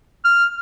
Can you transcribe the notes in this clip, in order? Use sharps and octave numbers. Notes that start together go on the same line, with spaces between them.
F6